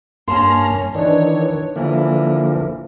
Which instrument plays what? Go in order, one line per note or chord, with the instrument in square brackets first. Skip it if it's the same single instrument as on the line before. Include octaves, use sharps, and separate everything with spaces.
[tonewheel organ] G2 A#3 A#5 [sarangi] C#4 [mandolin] A5 C6
[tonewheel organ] D#3 E3 [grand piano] D4 D#4 D5 [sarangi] C#5
[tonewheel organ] D3 F3 A#3 [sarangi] E3